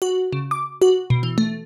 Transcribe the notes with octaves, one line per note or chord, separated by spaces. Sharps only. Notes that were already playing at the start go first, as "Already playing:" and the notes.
F#4
C#3
D6
F#4
B2
E3
A3